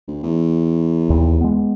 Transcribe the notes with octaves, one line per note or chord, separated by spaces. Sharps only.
D2
E2
D#2
G#3 B3